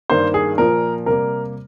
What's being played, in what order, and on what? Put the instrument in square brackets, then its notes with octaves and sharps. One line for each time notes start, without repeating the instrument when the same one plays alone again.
[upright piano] G2 D#3 A#3 C5
G#4
A#2 F3 A#3 A#4
C3 G3 A#3 A#4